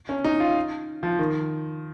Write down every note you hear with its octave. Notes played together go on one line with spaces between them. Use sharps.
C#4
D#4
F4
F3
D#3